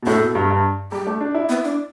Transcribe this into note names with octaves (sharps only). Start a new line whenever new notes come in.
B2
A2 A4
B2
G2
G2
G3 G4
A3
D4
E4
B3
D4